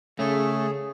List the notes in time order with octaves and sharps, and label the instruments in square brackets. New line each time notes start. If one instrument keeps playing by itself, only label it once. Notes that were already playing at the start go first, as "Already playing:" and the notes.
[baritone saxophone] C#3 [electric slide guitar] A3 [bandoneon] G#4